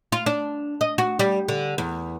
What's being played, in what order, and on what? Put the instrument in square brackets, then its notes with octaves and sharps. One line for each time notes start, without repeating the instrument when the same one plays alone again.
[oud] F4
D4
D#5
F#4
G3
D3
E2